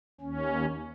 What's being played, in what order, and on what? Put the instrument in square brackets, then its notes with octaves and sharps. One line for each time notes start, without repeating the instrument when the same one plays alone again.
[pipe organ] D#2 C#4